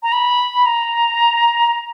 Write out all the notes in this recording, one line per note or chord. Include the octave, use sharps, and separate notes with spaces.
A#5
B5
A#5